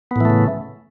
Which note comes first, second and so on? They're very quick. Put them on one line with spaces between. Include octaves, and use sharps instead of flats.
B3 A2 E3 A3 C#3